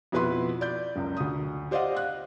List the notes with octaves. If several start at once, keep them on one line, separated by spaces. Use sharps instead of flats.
F2 B2 E4 B4 B5 C6
D5 G6
F#1 C#2
D2 D#6
G4 C5 D5 D#5 F5 F#5
F#6